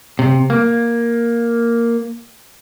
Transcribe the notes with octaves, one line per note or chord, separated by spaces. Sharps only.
C3
A#3